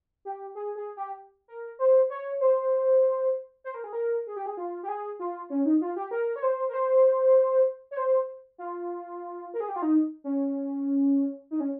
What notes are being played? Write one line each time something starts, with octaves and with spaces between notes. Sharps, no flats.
G4
G#4
G#4
G4
A#4
C5
C#5
C5
C5
A#4
G#4
A#4
G#4
G4
G#4
F4
G4
G#4
F4
C#4
D#4
F4
G4
A#4
C#5
C5
A#4
C5
C#5
C5
F4
A#4
G#4
G4
F4
D#4
C#4
D#4
C#4